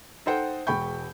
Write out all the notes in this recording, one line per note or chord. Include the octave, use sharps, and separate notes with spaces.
D#4 A4 C5 F#5 G5
E1 G#3 G5 B5 C#6 G6